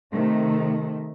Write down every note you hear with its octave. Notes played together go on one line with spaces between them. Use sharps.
C3 D#3 A3